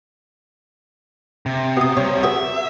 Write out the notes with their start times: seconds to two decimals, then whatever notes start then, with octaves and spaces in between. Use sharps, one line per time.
1.46 C3
1.77 B2 D#6
1.97 C3 G3 C#5
2.23 F#4 G#4 B4 E5